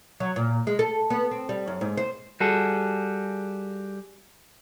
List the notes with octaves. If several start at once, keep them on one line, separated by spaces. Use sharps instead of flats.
F#3
A#2
G#3
A4
B3
C4
G3
F#2
G#2
C5
G3 F#4 G#4 A4